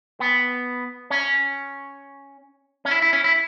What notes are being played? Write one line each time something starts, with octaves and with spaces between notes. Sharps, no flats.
B3
C#4
C#4
E4
E4
C#4
E4